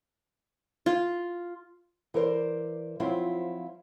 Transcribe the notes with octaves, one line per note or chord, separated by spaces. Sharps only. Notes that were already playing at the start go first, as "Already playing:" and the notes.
F4
E3 A#4 C5 D5
F3 F#3 C4 E4 F4